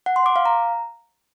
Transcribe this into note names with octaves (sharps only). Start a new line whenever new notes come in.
F#5
C6
D6
F5
A#5